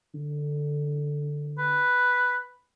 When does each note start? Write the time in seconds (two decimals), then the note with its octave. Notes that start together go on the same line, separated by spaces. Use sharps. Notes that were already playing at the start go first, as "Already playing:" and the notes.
0.15 D3
1.58 B4